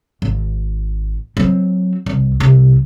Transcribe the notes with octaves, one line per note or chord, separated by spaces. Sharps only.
G#1
F#3 C4
C2
C2 C3